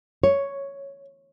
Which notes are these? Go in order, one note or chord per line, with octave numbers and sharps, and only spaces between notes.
C#5